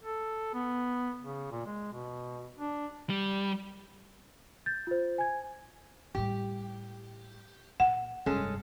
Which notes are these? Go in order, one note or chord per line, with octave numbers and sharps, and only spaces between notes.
A4
B3
C#3
A#2
G#3
B2
D4
G3
G6 A6
F4 C5
G#5 G#6
A2 G3 G4
A#2 F#5
F1 G2 G#3 C#4 A4